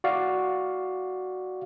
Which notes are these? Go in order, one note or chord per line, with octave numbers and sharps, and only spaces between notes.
F#4 D5 F5